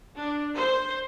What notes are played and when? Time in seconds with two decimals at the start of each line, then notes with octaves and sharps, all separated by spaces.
0.19 D4
0.57 C5